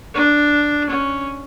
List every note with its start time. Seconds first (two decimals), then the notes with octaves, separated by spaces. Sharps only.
0.14 D4
0.90 C#4